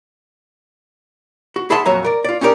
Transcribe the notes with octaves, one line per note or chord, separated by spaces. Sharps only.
F#4
E4 G#4 E5 F#5 A5 C6
F2 A#2 F#3 C#5 E5 A#5
A#4 D5
F4 D5
C#4 D#4 G4 A#4 D5